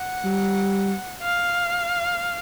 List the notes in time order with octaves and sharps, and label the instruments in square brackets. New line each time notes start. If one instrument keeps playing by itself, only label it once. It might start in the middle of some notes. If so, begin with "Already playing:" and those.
Already playing: [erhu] F#5
[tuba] G3
[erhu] F5